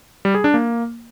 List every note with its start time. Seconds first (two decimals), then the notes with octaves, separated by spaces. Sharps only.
0.25 G3
0.35 G#4
0.44 D4
0.54 A#3